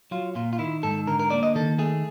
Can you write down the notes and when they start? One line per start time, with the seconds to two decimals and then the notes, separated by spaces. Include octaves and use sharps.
0.11 F#3 F4
0.35 A#2 F4
0.53 F4
0.59 D#3 E4
0.83 G#2 A4
1.07 D3 A#4
1.20 A#4
1.31 A#3 D5
1.43 D#5
1.55 D#3 A4
1.79 A3 G#4